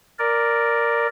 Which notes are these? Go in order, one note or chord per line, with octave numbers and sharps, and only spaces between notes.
A#4 D5